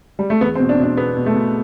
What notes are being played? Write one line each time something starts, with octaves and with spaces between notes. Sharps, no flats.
G3
A3
E2 B3
C4
B2
D4
B2 D4
B2 B3
B2
A3
B2